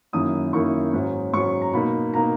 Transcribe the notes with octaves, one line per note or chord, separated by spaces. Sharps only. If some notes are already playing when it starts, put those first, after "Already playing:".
F#2 D#3 A#3 E4 D#6
F#2 D#3 A#3 E4 C#6
G#2 F#3 C#4
G#2 F#3 C#4 C#6
A#5
B2 A#3 D#4 B5
B2 A#3 D#4 A#5